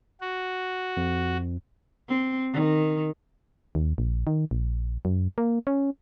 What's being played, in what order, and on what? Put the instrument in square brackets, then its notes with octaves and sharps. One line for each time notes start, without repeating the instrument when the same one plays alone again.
[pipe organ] F#4
[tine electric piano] F2
[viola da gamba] C4
D#3
[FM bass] D#2
A#1
D#3
A#1
F#2
A#3
C#4